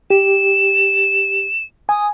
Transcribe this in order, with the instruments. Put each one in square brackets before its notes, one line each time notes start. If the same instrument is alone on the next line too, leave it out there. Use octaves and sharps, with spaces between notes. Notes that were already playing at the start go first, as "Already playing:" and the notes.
[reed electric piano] G4 [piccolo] E7
[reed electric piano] G#5 [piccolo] D#6